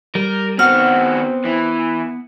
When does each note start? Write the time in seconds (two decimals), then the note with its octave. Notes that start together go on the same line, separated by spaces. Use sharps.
0.15 G3 A#4
0.59 D#3 B3 C4 F#4 F6
1.45 E3